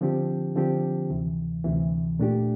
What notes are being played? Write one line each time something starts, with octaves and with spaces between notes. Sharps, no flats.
D3 F3 C4 G4
D3 F3 C4 G4
D2 C3 E3
D2 C3 E3
A#2 A3 D4 G4